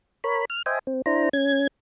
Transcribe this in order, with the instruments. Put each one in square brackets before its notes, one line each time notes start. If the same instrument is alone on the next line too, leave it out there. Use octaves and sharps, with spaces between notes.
[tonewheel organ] A#4 C#5 B5
F6
C5 D#5 E5 G5 G#5
C4
D4 E4 C5 A#5
C#4 G#6